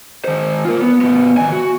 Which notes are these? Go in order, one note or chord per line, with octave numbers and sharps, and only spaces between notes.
D#3 C5
F4 A#4
B3
A2 B3
D#3 G#5
F#4